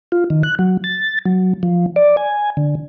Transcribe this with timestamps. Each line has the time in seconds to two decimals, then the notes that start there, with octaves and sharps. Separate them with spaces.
0.12 F4
0.30 D#3
0.43 F#6
0.59 F#3
0.84 A6
1.26 F#3
1.63 F3
1.96 D5
2.17 G#5
2.57 D3